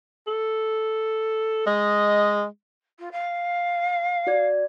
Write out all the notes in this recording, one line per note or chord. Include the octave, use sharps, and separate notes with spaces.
A4
G#3 D#5
F4
F5
F#4 D5 G#6